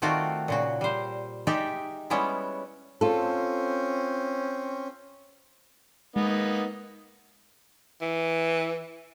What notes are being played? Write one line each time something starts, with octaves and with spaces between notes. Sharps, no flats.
D#3 A3 C4 F4 F#4 D5
A#2 C#3 F#4
G3 C5
G#3 D#4 G4 D5 E5 G5
G3 G#3 B3 C#4 E4
C4 C#4 F4 A4
G#3 A#3 B3 D#4
E3